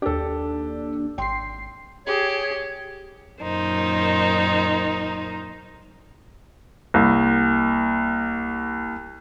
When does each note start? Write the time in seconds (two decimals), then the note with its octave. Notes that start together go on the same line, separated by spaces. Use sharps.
0.02 D#2 D4 G4 A4
1.18 G#1 G5 C6 C7
2.07 G4 G#4 C#5
3.42 F#2 A#2 D#3 D#4 C5
6.94 C2 A#3